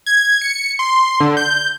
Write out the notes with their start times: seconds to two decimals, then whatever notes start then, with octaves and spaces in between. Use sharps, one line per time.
0.06 G#6
0.41 C#7
0.79 C6
1.20 D3
1.37 G6